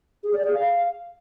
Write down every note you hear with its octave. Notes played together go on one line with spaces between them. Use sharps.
G#4
D5
G#4
F5